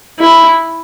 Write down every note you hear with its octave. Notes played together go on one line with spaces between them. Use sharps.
E4